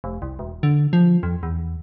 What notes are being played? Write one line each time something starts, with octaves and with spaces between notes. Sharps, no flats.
F1
C2
E1
D3
F3
F2
E2